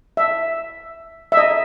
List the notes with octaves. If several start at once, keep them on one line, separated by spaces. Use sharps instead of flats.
E5
E5
D#5